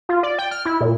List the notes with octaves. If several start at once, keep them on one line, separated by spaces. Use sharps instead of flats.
F4
D5
G5
F6
E4
A#2